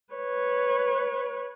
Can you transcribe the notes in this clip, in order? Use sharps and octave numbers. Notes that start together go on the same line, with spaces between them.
B4 C#5